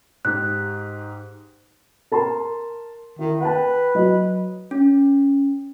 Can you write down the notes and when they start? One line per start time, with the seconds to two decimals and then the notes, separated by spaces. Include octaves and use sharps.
0.25 G#2 G4 F#6
2.12 A#4 A5 C6
3.19 D#3 E4
3.41 B4 F#5 G5 A5
3.95 F#3 D#5
4.71 C#4